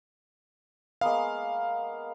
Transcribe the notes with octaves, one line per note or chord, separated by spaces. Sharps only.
G#3 A#3 B3 F5